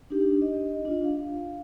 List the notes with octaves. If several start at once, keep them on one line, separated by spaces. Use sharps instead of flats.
D4 D#4 G4
D#5
D4 F4
F5